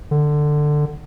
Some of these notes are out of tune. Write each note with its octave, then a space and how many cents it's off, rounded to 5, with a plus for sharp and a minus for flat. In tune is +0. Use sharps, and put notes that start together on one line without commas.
D3 +15